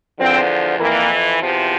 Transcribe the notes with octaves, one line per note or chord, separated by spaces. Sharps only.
E2 D3 F3 C4
F2 E3 A#3
E2 C3 F3